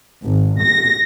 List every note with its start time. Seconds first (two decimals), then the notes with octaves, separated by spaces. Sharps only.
0.25 G#1
0.63 A#6